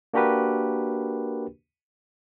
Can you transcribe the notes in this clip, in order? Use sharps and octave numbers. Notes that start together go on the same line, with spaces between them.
A#3 D4 F#4 G4 A#4 B4